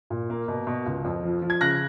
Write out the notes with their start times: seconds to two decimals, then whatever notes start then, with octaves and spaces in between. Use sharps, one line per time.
0.10 A#2
0.30 A#3
0.48 B2
0.67 B2
0.86 C#2
1.05 F2
1.23 F3
1.42 F3
1.50 G#6
1.61 C#3 F#6 A#6